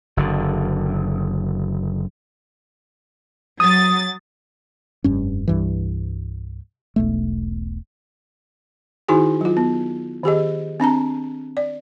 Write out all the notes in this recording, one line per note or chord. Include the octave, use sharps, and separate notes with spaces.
F#1 D3
F#3 D#6 A6
F1 G2 C#4
C2 G2 E3
E1 B1 A3
D#3 D#4 E4 F#4 G#4 G#5
F#3 F4
B3
D#3 G4 G#4 D#5
C4 D4 A5 A#5
D5